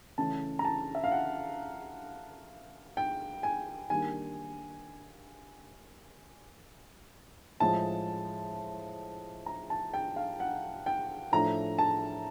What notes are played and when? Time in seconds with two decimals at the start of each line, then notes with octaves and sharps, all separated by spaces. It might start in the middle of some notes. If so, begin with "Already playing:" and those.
0.18 C#3 E3 A3 C#4 A5
0.59 A#5
0.65 A5
0.95 E5
1.04 F5
1.12 F#5
2.97 G5
3.43 G#5
3.90 D#3 G3 A#3 D4 G#5
7.60 A2 F3 G#3 A5
9.46 A#5
9.70 A5
9.94 G5
10.16 F5
10.40 F#5
10.86 G5
11.32 A2 F3 A3 D4 A#5
11.79 A5